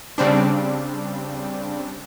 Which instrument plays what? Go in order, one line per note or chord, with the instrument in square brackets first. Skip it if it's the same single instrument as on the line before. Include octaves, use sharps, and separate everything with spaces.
[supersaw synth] C#3 G3 C4 D4